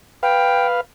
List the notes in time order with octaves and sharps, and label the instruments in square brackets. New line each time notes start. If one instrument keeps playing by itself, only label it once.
[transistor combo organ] B4 F5 [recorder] G5